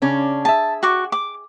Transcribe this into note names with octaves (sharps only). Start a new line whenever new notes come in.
C#3 C#4 D4
G#4 E5 A5
F#4 C#6 D6
D6